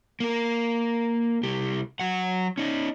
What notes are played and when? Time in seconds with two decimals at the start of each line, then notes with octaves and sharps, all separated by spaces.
0.20 A#3 A#4
1.43 C2 G4
2.00 F#3 F#5
2.58 C#4 D#4